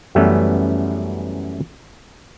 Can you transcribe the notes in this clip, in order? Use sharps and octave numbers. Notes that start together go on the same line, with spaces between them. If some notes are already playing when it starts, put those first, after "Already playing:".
F#2 E3 G3 A3 B3 C#4